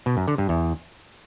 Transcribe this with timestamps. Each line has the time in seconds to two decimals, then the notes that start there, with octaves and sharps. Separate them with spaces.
0.06 B2
0.17 F#2
0.28 D3
0.38 G2
0.49 E2